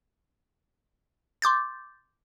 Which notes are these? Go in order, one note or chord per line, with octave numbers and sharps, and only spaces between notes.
C6 D6 G6 A6